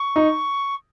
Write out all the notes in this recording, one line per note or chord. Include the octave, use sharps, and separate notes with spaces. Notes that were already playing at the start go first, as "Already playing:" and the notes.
Already playing: C#6
D#4